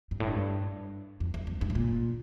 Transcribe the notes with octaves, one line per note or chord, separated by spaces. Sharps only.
G2
A2
G2
F2
E2
F2
G2
A2
A#2